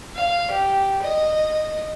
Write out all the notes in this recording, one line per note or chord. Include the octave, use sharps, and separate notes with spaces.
F5
G4
D#5